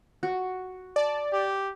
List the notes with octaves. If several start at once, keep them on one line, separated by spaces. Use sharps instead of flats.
F#4
D5 A5
G4